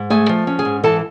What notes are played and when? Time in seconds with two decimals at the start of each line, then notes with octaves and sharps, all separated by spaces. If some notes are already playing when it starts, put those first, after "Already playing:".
Already playing: G#2
0.10 A3 G#4 G#5
0.29 F3
0.47 C#4
0.59 G#4 G#5
0.65 G#2
0.83 E3 A4 A5